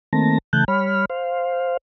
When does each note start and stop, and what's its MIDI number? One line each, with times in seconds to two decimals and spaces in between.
0.13 0.38 51
0.13 0.38 57
0.13 0.38 58
0.13 0.38 60
0.13 0.38 81
0.13 0.38 94
0.53 0.64 49
0.53 0.64 52
0.53 0.64 57
0.53 0.64 81
0.53 0.64 90
0.53 0.64 91
0.68 1.05 55
0.68 1.05 73
0.68 1.05 83
0.68 1.05 89
1.10 1.77 72
1.10 1.77 77